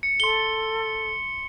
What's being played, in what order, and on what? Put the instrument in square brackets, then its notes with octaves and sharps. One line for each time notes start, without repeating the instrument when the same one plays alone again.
[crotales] C#7
[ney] A4 [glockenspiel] C6 G7